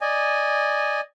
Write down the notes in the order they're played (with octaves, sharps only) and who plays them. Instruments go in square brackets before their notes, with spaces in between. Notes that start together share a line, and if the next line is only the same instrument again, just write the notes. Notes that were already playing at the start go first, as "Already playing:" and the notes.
[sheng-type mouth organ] D5 D#5 G#5